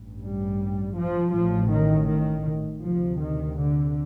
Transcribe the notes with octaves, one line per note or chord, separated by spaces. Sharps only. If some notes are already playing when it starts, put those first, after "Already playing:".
Already playing: A1 G2
G3
F3
A1 A2 F3
D#3
D#3
D2 C3 F3
D#3
D3